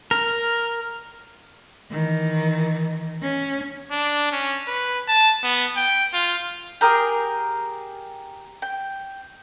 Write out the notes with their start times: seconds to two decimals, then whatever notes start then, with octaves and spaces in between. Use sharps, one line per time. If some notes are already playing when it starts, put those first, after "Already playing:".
0.11 A#4
1.91 D#3 E3
3.22 C#4
3.91 D4
4.32 C#4
4.68 B4
5.09 A5
5.44 B3
5.77 G5
6.14 F4
6.81 G4 G#4 A#4 G5
8.62 G5